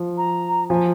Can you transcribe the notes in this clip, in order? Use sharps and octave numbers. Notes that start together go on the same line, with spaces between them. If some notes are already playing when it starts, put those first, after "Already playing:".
Already playing: F3
A#5
F3 G#5